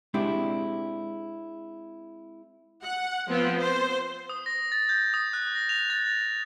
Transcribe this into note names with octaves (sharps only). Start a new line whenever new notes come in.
G#3 C4 D4 E4 G4
F#5
F3 B3 C4 F4
C5
D#6
A#6
A6
G6
D#6
F#6
A#6
F7
A6
A6